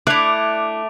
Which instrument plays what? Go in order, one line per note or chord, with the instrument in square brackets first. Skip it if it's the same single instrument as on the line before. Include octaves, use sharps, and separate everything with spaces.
[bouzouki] A3 [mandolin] D4 E4 [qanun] D5 [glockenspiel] D6 D7 F7